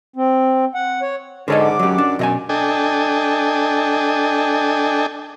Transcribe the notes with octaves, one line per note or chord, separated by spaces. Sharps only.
C4
F#5
C#5
G#2 D3 F#4 A4 A#4 C#5 D#5
F#5 D6
F#2 F#3 G4
D4
F#2 B2 D#5 G#5
D4 A4 D#5 G5 G#5